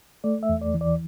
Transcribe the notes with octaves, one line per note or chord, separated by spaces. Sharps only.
A3 D5
E5
E2
D5
E3
D5